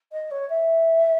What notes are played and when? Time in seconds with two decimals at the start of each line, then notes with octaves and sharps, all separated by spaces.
0.12 D#5
0.30 C#5
0.49 E5